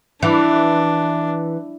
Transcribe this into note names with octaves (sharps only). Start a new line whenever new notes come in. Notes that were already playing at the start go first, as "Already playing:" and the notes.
E3 D4